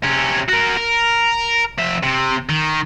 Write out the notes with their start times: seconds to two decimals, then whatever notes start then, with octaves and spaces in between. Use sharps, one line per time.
0.04 C3 C#4
0.48 F#4 A#4
0.77 A#4
1.79 F2 E5
2.03 C3
2.49 D#3